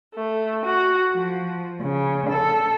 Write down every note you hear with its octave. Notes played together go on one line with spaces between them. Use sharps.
A3
F#4
F3
C#3
A4